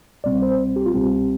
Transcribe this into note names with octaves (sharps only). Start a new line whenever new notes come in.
C2 B2 G3 C4 D5
C5
G4
F4
C2 B2 G3 C4 G4